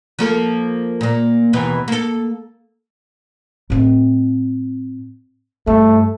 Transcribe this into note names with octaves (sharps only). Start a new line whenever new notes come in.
F3 A#3 A4
A#2 A#3
D#2 B2 E3
A#3 A4
A2 C4
G2 A3